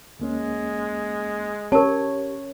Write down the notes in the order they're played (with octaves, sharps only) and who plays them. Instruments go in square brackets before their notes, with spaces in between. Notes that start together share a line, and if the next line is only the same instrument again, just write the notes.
[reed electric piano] D2 A#3 C#4 [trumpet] G#3
[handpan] C#4 C#5 [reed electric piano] G4 [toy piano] A#4 A5